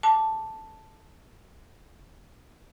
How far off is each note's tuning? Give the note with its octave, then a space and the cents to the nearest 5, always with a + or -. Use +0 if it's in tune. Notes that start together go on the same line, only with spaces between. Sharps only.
A5 +0 D6 -5